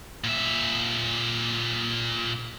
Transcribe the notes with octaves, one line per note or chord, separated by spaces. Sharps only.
A#2 E5